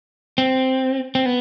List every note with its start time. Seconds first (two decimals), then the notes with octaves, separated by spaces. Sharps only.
0.38 C4
1.15 C4
1.26 B3